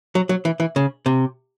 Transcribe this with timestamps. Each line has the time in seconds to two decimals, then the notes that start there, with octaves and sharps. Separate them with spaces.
0.15 F#3
0.29 F#3
0.45 E3
0.60 E3
0.76 C#3
1.06 C3